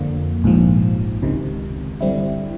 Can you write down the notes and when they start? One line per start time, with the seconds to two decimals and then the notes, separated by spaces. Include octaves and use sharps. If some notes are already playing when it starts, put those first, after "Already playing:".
Already playing: F2 D3 F3 A#3
0.44 A#1 G#2 F3
1.22 C#2 C3 D#3
2.01 G2 D3 G3 C4 E4